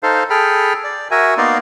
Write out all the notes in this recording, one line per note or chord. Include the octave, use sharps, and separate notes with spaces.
D#4 A4 C5 F5
G#4 A4 G5 B5 F6
D5
F#4 A#4 E5 G#5
A#3 B3 D#4 D5 F5 C6